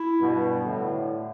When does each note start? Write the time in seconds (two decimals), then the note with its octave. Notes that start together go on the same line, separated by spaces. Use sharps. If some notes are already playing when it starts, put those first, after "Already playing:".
Already playing: E4
0.20 G2 B2
0.65 A2 D3